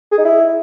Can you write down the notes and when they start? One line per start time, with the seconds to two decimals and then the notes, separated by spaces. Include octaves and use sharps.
0.12 G#4
0.18 D#4
0.25 E4